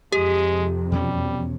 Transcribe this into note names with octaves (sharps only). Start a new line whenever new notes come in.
F2 C3 G#3 G4
E2 B2 G3 C#4